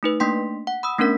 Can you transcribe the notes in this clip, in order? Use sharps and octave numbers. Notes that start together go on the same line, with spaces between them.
A3 D#4 B4
A3 A#3 D4 G5 C6 B6
F#5
B5 D#6 E6
A3 B3 C#4 D4 A#4 B6